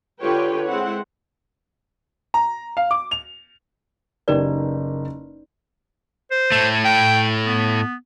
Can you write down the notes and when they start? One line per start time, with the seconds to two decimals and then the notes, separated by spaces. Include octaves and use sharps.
0.20 D3 F4 G4 B4 C#5 G5
0.68 G#3 C4 E4 F#5
2.34 A#5
2.77 F5
2.91 D6
3.11 F7
4.28 F#1 D#4 G4 A#4 B4 D5
6.31 C5
6.52 A2 A3
6.85 G5
7.45 B3